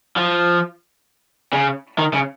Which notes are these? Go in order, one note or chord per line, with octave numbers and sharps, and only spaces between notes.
F3
C#3
D#3
C#3